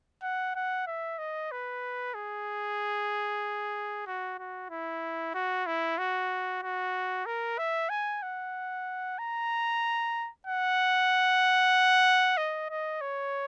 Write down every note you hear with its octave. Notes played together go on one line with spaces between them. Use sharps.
F#5
F#5
E5
D#5
B4
G#4
F#4
F#4
E4
F#4
E4
F#4
F#4
A#4
E5
G#5
F#5
A#5
F#5
D#5
D#5
C#5